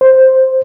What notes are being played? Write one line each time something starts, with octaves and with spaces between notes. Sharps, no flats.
C5